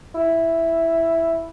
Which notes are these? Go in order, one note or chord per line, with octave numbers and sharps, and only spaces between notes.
E4